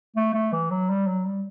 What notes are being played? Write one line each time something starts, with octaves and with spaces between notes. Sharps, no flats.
A3
A3
E3
F#3
G3
F#3
G3